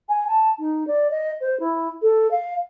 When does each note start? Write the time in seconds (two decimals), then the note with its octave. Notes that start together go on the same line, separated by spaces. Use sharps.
0.09 G#5
0.28 A5
0.59 D#4
0.87 D5
1.11 D#5
1.41 C5
1.60 E4
2.02 A4
2.31 F5